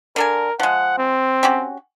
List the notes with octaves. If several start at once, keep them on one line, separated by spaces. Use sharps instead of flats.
D3 A4 A#4 G#5
F3 G#3 F#5
C4
C#4 F#4 G4